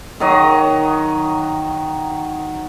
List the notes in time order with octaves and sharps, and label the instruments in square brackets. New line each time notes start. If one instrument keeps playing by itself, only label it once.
[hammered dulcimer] D#3 F#3 D#5